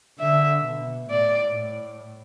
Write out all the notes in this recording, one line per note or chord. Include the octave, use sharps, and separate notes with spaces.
D3 E5
B2
A2 D5
A2